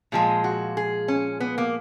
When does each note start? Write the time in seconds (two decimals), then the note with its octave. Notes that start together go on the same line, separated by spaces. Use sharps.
0.12 A#2 F3 G#3 G#4
0.44 F#4
0.77 G#4
1.08 C#4
1.40 B3
1.58 A#3